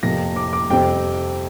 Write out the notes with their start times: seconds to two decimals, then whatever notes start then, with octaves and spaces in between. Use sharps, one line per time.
0.03 F2 C3 F3 A#3 A#6
0.36 D6
0.53 D6
0.70 F2 C3 G3 C4 G5